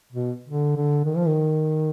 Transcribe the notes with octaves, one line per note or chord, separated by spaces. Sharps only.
B2
D3
D3
D#3
F3
D#3